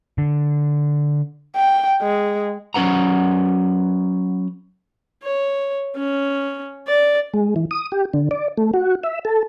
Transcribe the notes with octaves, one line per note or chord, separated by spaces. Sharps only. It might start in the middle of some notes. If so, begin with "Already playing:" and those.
D3
G5
G#3
F#3 C#4 B4 F#5 A#5
C#5
C#4
D5
G#3
E3
D#6
G4
D3
D5
A3
F#4
E5
A4